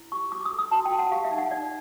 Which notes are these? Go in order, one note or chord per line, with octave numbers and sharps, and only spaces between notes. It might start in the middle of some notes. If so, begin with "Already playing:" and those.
Already playing: E4
G4 C#6
F#4 D6
D#6
A4
D#6
F#4 A5
G5
F#4
F#5
G4 F5
E5
D#4
F#5
D#4 D5